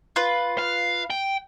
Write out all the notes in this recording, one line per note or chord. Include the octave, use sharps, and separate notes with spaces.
F4 B4
F5
G5